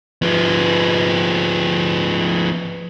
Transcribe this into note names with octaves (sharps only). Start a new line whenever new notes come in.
F3 B3